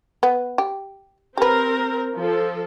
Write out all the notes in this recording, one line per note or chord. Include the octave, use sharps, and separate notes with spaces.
B3
G4
C4 G4 A#4 B4
F3 A4